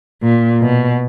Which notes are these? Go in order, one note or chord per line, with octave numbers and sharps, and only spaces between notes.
A#2
B2